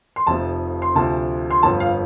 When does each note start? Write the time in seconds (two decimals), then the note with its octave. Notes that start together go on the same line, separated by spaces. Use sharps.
0.16 C6
0.27 F1 F2 C3 F3 A5
0.82 C6
0.95 D2 C3 F3 A5
1.50 C6
1.63 G1 F2 F3 A5
1.80 F5